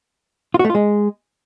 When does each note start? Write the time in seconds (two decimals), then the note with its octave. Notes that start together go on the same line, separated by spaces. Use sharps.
0.54 F4
0.59 F#4
0.65 A3
0.70 F4
0.75 G#3